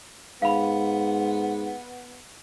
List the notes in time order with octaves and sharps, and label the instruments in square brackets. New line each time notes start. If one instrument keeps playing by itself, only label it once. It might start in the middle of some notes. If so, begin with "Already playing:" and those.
[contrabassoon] G#2 [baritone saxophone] B3 [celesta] F5 B5